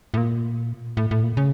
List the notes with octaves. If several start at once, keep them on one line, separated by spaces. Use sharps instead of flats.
A2
A#2
A2
A2
A#2
C#3